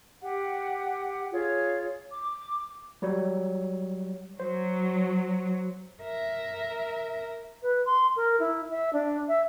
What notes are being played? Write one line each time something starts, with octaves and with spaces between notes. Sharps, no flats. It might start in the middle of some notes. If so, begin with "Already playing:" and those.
G4 F#5
F4 G#4 C#5
D6
F#3 G3 C#5
F#3 C5
A#4 E5
B4
C6
A#4
E4
E5
D4
E5